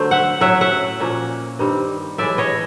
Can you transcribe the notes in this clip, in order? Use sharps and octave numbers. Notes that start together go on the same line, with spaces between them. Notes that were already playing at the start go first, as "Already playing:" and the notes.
Already playing: D3 F#3 A3 C5
E5 F#5
A2 F#3 A3 C#4 E5 F#5
E5 F#5
A#2 F3 A#3 C#4
G2 D#3 G3 C4
A2 E3 G#3 D5 E5
C#5 D#5